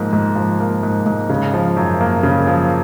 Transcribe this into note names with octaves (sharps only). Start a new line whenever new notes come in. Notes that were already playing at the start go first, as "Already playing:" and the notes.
Already playing: G#2 F3 A#3
G#2
F3
A#3
G#2
G#2
C#3
F3
F#2
A#3
C#3
F3